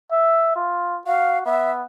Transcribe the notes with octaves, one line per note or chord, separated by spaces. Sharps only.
E5
F4
F#4 F5
B3 E5